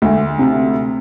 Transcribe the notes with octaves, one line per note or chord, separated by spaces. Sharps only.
D2
C3